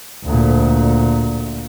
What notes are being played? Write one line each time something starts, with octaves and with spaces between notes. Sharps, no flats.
D2 A#2